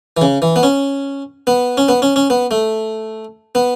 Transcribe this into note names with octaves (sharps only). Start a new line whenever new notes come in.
E3
C#3
E3
B3
C#4
B3
C#4
B3
C#4
C#4
B3
A3
B3